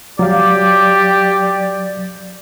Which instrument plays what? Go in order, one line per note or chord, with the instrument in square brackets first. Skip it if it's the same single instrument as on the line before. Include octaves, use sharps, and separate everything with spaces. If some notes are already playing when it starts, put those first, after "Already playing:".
[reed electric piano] F#3 F5 [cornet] G4 [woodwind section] D5